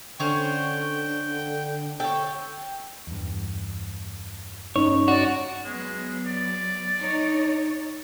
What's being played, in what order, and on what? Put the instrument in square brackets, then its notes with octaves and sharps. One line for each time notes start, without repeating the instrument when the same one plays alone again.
[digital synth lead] D3 [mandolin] C#4 C5 C#5 [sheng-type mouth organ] G5
[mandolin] A4 C#5 [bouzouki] G5
[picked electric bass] E2 G2
[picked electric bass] G2 [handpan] C#4 D#4 [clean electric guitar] C#5
[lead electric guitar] F#4 [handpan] D5
[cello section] F#3 B3 [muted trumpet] G#3
[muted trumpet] D5
[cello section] D#4 C#5